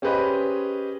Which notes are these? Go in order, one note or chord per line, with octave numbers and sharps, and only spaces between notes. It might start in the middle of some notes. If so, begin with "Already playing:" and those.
C#4 G4 G#4 B4 C5 D#5